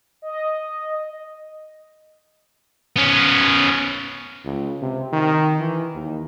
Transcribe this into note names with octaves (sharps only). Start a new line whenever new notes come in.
D#5
B3 C#4
C#2
C3
D#3
E3
D#2